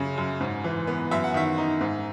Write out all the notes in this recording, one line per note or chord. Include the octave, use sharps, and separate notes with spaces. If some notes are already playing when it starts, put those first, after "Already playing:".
Already playing: F#2 C#3
F#2
G#2
E3
B3
F#2 E5
F#5
D#3 E5
D#4
G#2